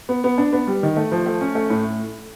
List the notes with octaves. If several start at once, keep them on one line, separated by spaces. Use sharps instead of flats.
B3
B3
D4
B3
G3
D#3
A3
F3
A3
C#4
A3
A2